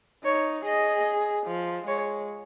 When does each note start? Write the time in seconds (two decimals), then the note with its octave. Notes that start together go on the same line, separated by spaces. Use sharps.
0.25 D#4 C#5
0.65 G#4 D#5
1.47 F3
1.87 G#3 C#5